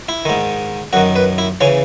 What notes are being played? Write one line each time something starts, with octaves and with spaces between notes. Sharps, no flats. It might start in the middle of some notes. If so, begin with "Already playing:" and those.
E4
G#2 D#3
F#2 D#3 F#4
B4
E4
C#3 E3 C#4